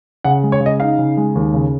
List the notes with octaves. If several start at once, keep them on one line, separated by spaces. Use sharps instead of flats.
C#3 F#5
G#3
C#5
C#3
D#5
D#4 F5
C#3
G#3
D#2
C#3